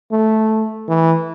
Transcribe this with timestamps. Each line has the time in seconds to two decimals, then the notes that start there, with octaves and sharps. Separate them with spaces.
0.12 A3
0.88 E3